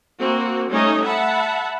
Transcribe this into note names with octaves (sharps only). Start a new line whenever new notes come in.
A#3 C4 F#4
G3 A3 C#4 D#4 C#5 D#5
E5 F#5 A5 B5